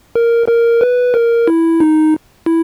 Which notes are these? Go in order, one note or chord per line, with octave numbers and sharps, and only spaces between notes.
A#4
A#4
B4
A#4
E4
D#4
E4